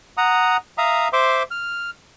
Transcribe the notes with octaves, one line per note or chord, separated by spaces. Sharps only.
F#5 A#5 D#6
E5 F5 A#5 D#6
C5 E5 C6 D6
F6